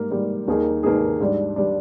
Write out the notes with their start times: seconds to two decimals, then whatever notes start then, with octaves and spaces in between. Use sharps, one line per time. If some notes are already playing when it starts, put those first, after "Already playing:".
Already playing: G#2 G3 A#3
0.11 G#2 G3 A#3
0.48 D#2 D#3 A#3 D#4 G#4
0.83 D#2 D#3 A#3 D#4 G#4
1.20 G#2 G3 D4
1.56 G3 D4